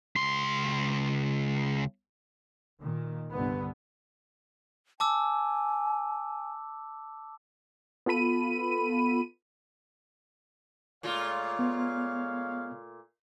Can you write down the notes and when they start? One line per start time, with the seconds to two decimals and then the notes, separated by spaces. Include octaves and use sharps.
0.16 C#2 C6
2.80 A#2 D#3
3.32 C2 G2 D3 B3
5.00 G#5 A5 D6 E6
8.06 B3 F4 A4 B5 D#7
11.03 A#2 G#3 A3 F4 C#5 F5
11.59 B3